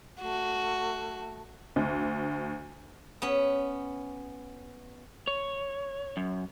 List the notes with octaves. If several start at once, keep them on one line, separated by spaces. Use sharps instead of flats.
A3 F#4
D2
B3 C#4
C#5
F#2